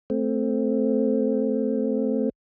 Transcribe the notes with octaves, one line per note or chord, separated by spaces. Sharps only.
A3 C4